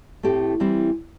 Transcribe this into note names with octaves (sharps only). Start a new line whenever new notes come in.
A2 A3 C4 G4
E3 G3 C4